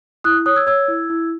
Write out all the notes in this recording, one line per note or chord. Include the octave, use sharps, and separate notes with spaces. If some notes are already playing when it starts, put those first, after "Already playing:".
E4 D#6 F#6
C#5 D#6 F#6
E6 G#6
C#5 E6 G#6
E4
E4